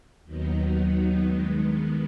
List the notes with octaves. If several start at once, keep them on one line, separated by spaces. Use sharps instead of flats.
D#2 D#3 F#3 B3 D#4
G2 D#3 G#3 B3